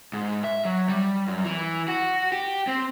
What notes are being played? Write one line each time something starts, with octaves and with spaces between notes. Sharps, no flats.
G#2
E5
F#3
G3
F#2
E3
F#4
G4
C4